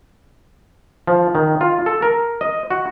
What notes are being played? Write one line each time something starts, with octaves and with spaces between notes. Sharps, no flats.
F3
D#3
F4
A4
A#4
D#5
F#4